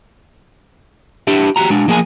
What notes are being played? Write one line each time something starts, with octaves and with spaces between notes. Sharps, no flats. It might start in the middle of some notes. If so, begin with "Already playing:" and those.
D4 E4 G4 E5
F#4 G4 A#5
G#3 D4
F3 A#3 G#4 G5 G#5